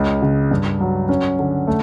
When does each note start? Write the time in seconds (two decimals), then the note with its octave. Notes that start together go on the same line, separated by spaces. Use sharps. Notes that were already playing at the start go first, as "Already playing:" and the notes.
Already playing: C#2 C#3
0.22 C#3
0.51 G2
0.81 F#3
1.09 C#4
1.39 D3
1.67 A3